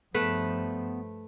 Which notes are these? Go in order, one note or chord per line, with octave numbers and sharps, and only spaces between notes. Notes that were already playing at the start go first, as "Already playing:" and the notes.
G2 F3 A3 B3 B4